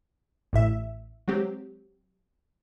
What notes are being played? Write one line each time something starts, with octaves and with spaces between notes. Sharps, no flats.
A1 A2 E5
F#3 G#3 C4 G4